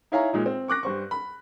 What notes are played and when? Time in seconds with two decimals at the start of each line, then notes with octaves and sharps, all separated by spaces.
0.12 D#4 E4 C#5 F5 G#5 A#5
0.33 A#2 G#3 D#4
0.46 C4
0.68 C#6 D6 F#6 A#6
0.83 G2 C5 C#6
1.11 B5